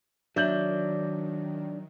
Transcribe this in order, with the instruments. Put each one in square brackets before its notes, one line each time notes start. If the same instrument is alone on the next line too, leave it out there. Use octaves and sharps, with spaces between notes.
[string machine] D#3 [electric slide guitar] F#3 [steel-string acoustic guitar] D4 D5 [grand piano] E5 G6 F#7